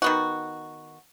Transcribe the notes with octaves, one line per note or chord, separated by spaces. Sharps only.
D#3 B3 F#4